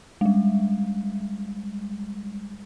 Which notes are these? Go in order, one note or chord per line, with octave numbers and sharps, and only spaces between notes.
G3 G#3